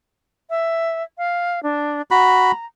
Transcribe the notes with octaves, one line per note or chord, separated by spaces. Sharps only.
E5
F5
D4
F#4 A#5 B5